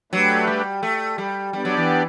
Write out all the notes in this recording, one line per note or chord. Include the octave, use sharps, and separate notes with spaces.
F#3 A3 D4 G4 B4
G3
A3
G3
G3 B3 D4 G4 D5
F#3
E3